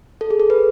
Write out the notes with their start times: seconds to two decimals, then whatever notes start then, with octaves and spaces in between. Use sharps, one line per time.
0.21 A4
0.30 G#4
0.40 A4
0.50 B4